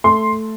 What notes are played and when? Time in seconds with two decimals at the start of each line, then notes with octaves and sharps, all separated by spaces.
0.04 A3 C6